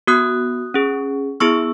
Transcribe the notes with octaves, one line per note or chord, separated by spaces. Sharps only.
B3 F#4 D#6 F#6
C#4 G#4
B3 E4 G#4 C#6 E6